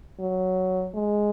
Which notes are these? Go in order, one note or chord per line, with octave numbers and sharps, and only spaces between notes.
F#3
G#3